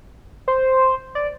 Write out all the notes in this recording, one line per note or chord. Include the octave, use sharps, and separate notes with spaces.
C5
D5